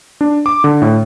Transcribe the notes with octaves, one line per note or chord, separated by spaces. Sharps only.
D4
D6
D3
A2